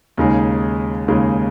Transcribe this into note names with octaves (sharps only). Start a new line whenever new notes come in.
D#2 C#3 G#3 D#4 G#4
D#2 C#3 G#3 D#4 G#4